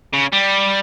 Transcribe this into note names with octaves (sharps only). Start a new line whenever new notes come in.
C#3
G3